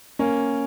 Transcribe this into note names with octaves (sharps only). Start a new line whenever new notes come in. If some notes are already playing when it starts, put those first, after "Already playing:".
A#3 C#4